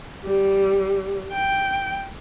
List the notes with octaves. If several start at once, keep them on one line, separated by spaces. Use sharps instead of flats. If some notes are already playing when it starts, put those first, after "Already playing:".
G3
G5